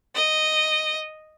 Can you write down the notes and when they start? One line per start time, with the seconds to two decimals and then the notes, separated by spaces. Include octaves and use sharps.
0.15 D#5